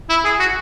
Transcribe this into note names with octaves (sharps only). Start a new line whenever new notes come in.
E4
G#4
F#4